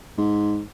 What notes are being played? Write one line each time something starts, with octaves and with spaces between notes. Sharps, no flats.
G#2